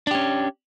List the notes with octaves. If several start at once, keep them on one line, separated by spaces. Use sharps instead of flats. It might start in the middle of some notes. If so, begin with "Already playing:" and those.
C#4 D4 G4